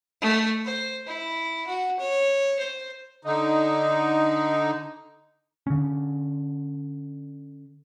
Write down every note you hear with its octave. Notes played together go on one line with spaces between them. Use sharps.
A3
C5
E4
F#4
C#5
C5
D3 D#4
D3 C#4